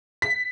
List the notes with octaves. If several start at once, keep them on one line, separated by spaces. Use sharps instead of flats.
B6